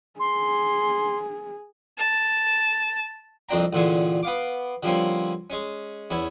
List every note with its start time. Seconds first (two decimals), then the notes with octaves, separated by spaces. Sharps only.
0.20 G#4 C6
1.98 A5
3.49 C2 F2 C4 D4 G5 A#5
3.73 A1 A#2 D3 C#4 G#4
4.23 B3 F5 D6
4.83 D3 F3 G3 A#3 C4 C#4
5.50 G#3 C#4
6.10 E2 C#4 E4